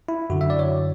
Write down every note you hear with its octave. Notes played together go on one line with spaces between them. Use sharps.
E4
F#2 D3 F#4
E5
D5
C#5